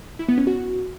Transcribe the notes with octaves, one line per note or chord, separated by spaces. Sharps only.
E4
B3
C#4
F#4